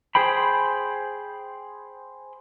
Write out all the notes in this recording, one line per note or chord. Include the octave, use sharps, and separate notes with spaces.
G#4 C5 G5 B5